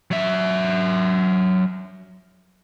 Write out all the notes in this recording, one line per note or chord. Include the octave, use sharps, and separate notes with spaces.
F#3 E5